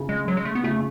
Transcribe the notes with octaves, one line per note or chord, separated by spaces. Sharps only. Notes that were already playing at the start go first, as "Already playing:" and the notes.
Already playing: C#3
G#3
F#3
G#3
A3
B3
C#3 A3